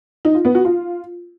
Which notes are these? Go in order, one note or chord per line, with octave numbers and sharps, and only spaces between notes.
D#4
F4
B3
F#4
F4